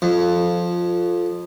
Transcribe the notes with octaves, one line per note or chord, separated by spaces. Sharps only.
F2